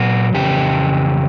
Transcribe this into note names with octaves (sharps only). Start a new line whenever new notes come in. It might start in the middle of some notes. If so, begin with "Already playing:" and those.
Already playing: A#2 F#3 F#4
F2 C#3 E3 G4